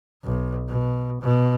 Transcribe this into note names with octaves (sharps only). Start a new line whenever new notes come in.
B1
B2
B2